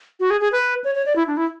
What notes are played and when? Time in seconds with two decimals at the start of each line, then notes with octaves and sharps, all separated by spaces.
0.20 F#4
0.30 G#4
0.41 G#4
0.52 B4
0.84 C#5
0.95 C#5
1.06 D5
1.16 E4
1.27 D4
1.37 E4